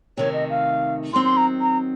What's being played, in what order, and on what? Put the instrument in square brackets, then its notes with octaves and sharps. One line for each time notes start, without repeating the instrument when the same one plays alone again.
[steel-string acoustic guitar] C3 D#3 A3 [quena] C#5
[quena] D#5
F5
[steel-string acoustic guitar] D#3 F#3 C4 [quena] C6
[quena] C6
A#5
A#5